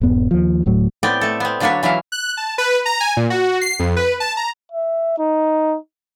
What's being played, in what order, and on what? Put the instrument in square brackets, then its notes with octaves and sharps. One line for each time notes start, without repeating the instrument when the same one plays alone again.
[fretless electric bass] D#1 G2 B3
D#2 F3
D1 A2 F#3
[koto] A2 B3 C4 D5 G5
A3 A4
B3 C4
D3 F#3 A#3 D4 B4 C#5
E3 F#3 C#4 E4 F5
[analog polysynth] F#6
A5
B4
A#5
G#5
A#2
F#4
C7
F2
B4
A5
A#5
[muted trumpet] E5
D#4